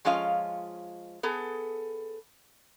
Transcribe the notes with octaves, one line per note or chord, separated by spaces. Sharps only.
F3 G#3 C#4 F4 D#5 F5
B3 G#4 A4